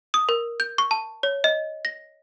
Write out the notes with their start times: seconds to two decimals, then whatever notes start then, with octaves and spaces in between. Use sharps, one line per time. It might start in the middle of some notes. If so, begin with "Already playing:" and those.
0.14 D#6
0.29 A#4
0.60 G6
0.78 C#6
0.91 A5
1.23 C#5
1.44 D#5
1.85 A#6